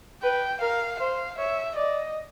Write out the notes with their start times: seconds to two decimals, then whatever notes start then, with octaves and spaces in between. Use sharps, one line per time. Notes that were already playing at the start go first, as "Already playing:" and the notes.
0.23 B4 G5
0.61 A#4 F5
1.00 C5 F5
1.38 C#5 E5
1.76 D5 D#5